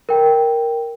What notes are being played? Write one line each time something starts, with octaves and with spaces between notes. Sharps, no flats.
A#4 G5